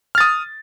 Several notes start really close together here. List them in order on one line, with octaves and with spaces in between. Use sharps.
F6 A6 D#6